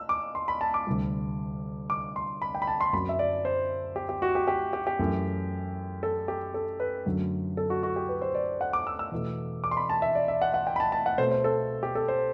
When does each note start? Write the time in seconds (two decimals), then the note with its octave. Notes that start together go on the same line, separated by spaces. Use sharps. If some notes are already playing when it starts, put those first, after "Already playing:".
Already playing: E6
0.09 D6
0.35 C6
0.48 B5
0.61 A5
0.74 D6
0.87 D2 C3 G3
1.90 D6
2.16 C6
2.42 B5
2.55 G5
2.62 B5
2.67 A5
2.81 C6
2.93 F#2 F#3 C4 B5
3.09 E5
3.19 D5
3.45 C5
3.96 G4
4.09 G4
4.22 F#4
4.35 G4
4.47 G4
4.73 G4
4.87 G4
4.99 F#2 E3 A3
6.03 A4
6.28 G4
6.54 A4
6.80 B4
7.06 F#2 D3 F#3 A3
7.57 A4
7.70 F#4
7.83 F#4
7.96 G4
8.09 B4
8.22 C5
8.35 D5
8.61 F#5
8.73 D6
8.87 E6
8.99 E6
9.12 E2 B2 A3
9.64 D6
9.71 C6
9.77 B5
9.90 A5
10.02 E5
10.15 D5
10.28 E5
10.42 F#5
10.54 F#5
10.67 G5
10.76 B5
10.80 A5
10.92 A5
11.06 F#5
11.18 B2 A3 C4 C5
11.31 C5
11.44 A4
11.83 G4
11.95 A4
12.08 C5